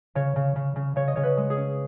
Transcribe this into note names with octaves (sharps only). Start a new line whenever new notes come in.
C#3 C#5
C#3
C#3
C#3
C#3 C#5
D#5
C#3 C#5
B4
G#3
G#4
C#4